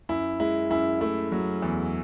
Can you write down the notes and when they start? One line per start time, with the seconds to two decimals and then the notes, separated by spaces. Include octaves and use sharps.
0.09 F#2 E4
0.40 G#3 E4
0.70 F#2 E4
1.01 A3 E4
1.32 F#3
1.62 E2